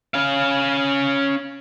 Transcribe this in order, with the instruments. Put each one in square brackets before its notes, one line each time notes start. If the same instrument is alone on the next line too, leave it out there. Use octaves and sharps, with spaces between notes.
[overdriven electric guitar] C#4 F5